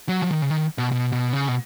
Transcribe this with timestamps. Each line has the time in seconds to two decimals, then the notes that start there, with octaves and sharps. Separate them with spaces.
0.09 F#3
0.22 F3
0.30 D#3
0.42 C#3
0.50 D#3
0.78 B2
0.92 B2
1.12 B2
1.33 C#3
1.48 B2